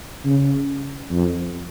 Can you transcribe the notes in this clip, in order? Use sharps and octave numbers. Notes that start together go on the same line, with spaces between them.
C#3
F2